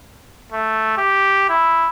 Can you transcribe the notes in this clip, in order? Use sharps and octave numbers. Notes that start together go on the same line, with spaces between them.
A3
G4
E4